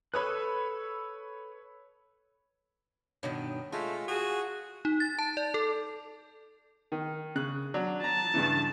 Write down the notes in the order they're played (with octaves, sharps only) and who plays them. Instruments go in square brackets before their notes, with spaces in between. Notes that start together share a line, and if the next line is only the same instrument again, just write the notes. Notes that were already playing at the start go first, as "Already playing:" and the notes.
[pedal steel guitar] A4 D#6 F#6 [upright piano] B4 C#5 B5
[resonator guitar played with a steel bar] G2 B2 D#3 [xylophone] C#5
[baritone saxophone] G#3 [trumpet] A3 [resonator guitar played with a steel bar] F4
[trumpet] F#4 [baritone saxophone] G#4
[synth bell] D#4
A6
A5
D5
A4
[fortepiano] D#3
C#3 F#6
F#3 D4
[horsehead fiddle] A5 [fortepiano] A#5
[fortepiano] G2 C#3 E3